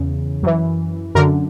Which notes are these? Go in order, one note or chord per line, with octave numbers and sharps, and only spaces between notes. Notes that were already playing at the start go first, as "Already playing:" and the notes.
Already playing: E2 C#3
F#2 E3
F#2 D3 A#4